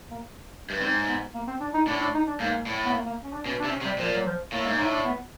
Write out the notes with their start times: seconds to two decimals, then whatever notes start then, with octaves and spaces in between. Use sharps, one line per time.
0.11 A#3
0.70 G2
0.81 G#2 C4
1.08 B3
1.34 A#3
1.47 C4
1.60 D4
1.74 D#4
1.87 A2 D4
2.01 D4
2.14 D#4
2.27 D4
2.40 G#2 A#3
2.66 A2
2.85 B3
2.93 A#3
3.06 A#3
3.24 C#4
3.33 D4
3.46 B2 C#4
3.59 D4
3.64 C3
3.72 C#4
3.82 C3
3.85 G3
3.98 A#2 F3
4.14 F#3
4.26 F3
4.52 A2 A#3
4.65 G#2 A#3
4.77 A2 D#4
4.91 D4
5.05 B3